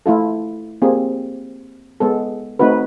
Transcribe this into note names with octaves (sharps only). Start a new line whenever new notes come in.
A3 E4 F4 A4
A#3 C4 F4 G4 G#4
G#3 B3 A4
A3 C4 D#4 F#4 B4